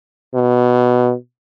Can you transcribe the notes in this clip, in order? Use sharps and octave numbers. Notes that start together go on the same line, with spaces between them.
B2